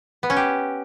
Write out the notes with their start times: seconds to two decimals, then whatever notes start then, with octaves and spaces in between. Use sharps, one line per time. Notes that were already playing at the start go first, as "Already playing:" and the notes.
0.23 B3
0.30 C#4
0.37 G4